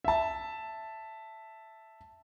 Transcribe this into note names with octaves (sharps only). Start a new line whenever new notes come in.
E5 A5